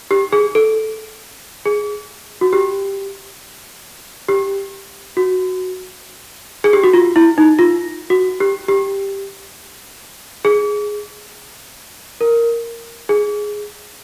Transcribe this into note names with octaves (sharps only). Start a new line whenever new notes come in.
G4
G#4
A4
G#4
F#4
G4
G4
F#4
G#4
G4
F#4
F4
E4
D#4
F4
F#4
G4
G4
G#4
A#4
G#4